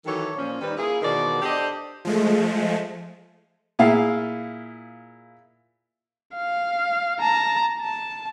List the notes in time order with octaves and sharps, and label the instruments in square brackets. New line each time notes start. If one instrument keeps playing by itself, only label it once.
[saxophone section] D#3 E3 F#3 G4 A4 C#5
A#2 F3 C#4
D#3 G3 B4
A#3 E4 F4 G#4
E2 B2 D#3 F3 A#4 D5
D4 G4 A4 C5 D5 D#5
[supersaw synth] F3 G#3 A3
[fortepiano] A#2 E4 G#4 F5
[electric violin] F5
A5 A#5
A5